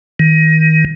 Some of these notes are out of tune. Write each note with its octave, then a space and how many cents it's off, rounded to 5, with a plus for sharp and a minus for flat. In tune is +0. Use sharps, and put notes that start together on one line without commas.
D#3 +25